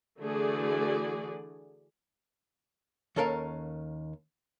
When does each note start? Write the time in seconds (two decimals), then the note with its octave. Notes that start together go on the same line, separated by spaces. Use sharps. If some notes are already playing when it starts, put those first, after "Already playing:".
0.20 D3 E3 A3 F#4 G#4 D5
3.16 D#2 C#4 A4 A#4 F5